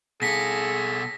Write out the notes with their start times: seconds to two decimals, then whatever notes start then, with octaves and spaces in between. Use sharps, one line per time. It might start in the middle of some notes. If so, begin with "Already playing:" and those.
0.22 B2 G#4 A4 A#6 B6